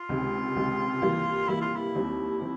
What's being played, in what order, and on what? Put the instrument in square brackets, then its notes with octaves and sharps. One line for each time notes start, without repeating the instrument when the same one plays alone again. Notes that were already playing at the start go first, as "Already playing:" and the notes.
Already playing: [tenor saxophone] F4
[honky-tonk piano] C#2 C3 D#3 G#3
C#2 C3 D#3 G#3
E3 G3 A#3
[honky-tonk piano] E3 G3 A#3 [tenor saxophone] E4
[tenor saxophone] F4
E4
[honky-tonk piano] D#2 D#3 G3 C4
D#3 C4